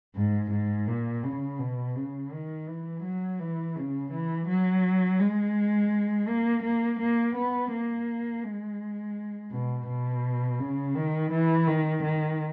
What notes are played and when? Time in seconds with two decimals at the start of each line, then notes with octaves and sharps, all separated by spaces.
0.16 G#2
0.51 G#2
0.88 A#2
1.23 C#3
1.59 B2
1.96 C#3
2.32 D#3
2.68 E3
3.03 F#3
3.40 E3
3.76 C#3
4.11 E3
4.47 F#3
5.20 G#3
6.28 A#3
6.63 A#3
7.00 A#3
7.35 B3
7.71 A#3
8.44 G#3
9.52 B2
9.88 B2
10.60 C#3
10.95 D#3
11.31 E3
11.67 D#3
12.03 D#3